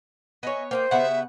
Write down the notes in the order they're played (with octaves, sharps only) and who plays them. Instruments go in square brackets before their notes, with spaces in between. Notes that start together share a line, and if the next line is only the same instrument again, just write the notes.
[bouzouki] B3 C#5 [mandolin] D#5 E5 G#5
[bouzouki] A#3 [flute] C5 [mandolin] D#5 F5 G5
[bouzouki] C#3 B3 [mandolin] G4 B4 F#5 [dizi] E5